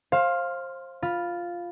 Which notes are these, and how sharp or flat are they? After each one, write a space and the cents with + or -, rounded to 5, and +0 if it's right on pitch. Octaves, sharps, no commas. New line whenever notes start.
C5 +25 F5 +0 C6 +0
F4 +0 B5 +0